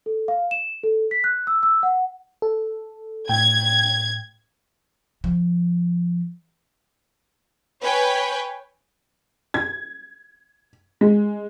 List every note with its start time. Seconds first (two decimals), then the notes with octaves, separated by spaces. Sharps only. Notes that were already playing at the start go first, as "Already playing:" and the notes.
0.06 A4
0.28 F5
0.51 E7
0.84 A4
1.11 B6
1.24 F#6
1.47 E6
1.63 E6
1.83 F#5
2.42 A4
3.29 A2 G5 G#6
5.24 F3
7.83 B4 C#5 G5 G#5
9.54 G#6
11.01 G#3